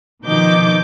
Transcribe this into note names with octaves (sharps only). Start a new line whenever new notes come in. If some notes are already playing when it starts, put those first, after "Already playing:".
B2 D#3 F3 D#4 D6 G6